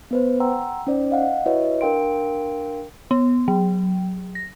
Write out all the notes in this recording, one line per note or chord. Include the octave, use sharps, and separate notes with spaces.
B3 B4 C5
F#5 G5 A#5 C6 E6
C#4 D#4 C5 D5
D#5 F5 F#5
E4 F#4 B4 C#5 D#5 E5
D4 A#4 F5 G5 C6 D7
B3
F#3
A#6